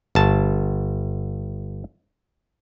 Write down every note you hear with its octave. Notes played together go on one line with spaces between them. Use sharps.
G1 A5